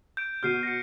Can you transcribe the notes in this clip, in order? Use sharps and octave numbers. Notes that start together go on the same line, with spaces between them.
G6 D7
B2 F#4 F6 G6 C7 D#7
A#6 C#7